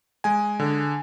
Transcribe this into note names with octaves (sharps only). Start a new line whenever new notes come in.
G#3 G#5
D3